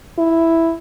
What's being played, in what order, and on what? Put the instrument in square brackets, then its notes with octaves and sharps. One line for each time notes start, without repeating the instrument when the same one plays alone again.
[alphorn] E4